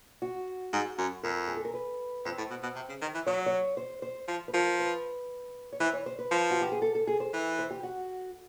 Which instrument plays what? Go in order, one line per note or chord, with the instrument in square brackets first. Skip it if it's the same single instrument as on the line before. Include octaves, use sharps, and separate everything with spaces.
[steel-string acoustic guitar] F#4
[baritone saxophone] G#2
F#2
[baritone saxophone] F2 [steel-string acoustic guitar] A#4
[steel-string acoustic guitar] G#4
A4
A#4
B4
[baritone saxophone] F2 [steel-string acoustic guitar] C5
[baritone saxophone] A2
B2
B2
C3
C#3
D#3
E3
[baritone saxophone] F#3 [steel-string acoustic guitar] C#5
[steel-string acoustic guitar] C#5
C5
C5
[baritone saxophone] F3
[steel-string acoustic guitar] B4
[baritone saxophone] F3 [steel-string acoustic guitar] A#4
[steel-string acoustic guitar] B4
C#5
[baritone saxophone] E3 [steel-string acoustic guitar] C5
[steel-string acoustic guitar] C#5
C5
B4
[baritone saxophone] F3
[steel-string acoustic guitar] F#4
G4
G#4
A4
A4
G#4
C5
[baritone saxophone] E3
[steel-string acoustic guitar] C5
G4
F#4